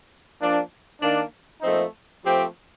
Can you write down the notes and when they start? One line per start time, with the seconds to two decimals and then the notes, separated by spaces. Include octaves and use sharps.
0.39 F3 A#3 D4
1.00 D#3 A#3 D4
1.61 A#2 F3 A3 C4 D#4
2.24 F3 A3 C4 G4